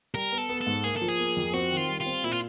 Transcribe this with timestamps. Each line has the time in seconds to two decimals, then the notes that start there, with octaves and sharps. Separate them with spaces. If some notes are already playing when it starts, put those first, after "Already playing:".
0.15 G3 A#4
0.32 B3
0.38 A4
0.49 B3
0.61 A4
0.67 G#2
0.84 A#3 G#4
0.96 A4
1.01 F3
1.08 G#4
1.19 A#3
1.36 F2
1.53 C4 F#4
1.71 D#3
1.77 F4
1.88 G3
2.00 F4
2.06 C4
2.23 A#2 E4
2.31 F4